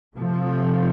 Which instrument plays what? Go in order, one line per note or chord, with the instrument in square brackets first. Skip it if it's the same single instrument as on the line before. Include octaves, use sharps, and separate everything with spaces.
[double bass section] C3 F3 A3